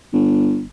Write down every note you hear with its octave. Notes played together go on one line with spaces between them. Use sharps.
G1